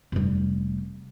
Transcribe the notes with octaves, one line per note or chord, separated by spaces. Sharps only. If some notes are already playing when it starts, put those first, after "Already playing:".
F1 G3